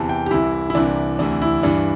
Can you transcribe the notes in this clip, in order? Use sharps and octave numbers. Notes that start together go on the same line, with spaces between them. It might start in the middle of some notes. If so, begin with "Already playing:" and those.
Already playing: E2 C3 E3 A5
G5
G4
C2 C3 E3 E4
E4
C2 C3 E3 D4
D2 C3 E3 D4
E4
G2 E3 D4